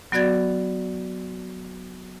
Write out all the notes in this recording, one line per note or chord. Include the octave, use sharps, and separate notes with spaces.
F#3 B3 F#4 D5 G#6 A6